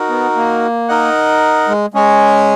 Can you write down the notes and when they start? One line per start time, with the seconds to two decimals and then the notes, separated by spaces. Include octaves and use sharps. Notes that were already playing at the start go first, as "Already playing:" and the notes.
Already playing: D#4 F#4 A#4
0.09 B3
0.35 A#3
0.88 D#4 A#4 D#5 F#5
1.68 G#3
1.94 G#3 C#4 G#4 C#5 G#5